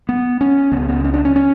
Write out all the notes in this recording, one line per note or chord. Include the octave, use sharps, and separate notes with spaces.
B3
C#4
C#2 B3
C#3
B3
C#4
D4
C#4
C#4